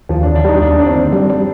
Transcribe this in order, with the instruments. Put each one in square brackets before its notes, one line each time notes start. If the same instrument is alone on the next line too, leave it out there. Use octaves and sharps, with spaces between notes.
[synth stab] D#2 [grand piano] F3
[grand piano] D4
[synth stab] D#2
[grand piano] D4
[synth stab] G3 [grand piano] D#4
[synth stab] D#2 [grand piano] D4
[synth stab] D3 [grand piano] D4
[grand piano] C4
[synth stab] D#2
G3
G3